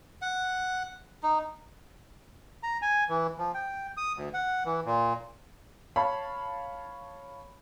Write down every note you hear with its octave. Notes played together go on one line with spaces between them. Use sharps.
F#5
D#4
A#5
G#5
E3
F3
G5
D#6
D2
F#5
E3
A#2
C#5 F5 A5 B5